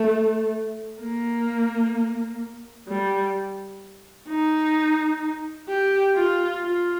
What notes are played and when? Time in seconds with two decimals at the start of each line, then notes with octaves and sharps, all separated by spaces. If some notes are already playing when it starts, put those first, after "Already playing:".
Already playing: A3
1.01 A#3
2.89 G3
4.29 D#4
5.69 G4
6.16 F4
6.63 F4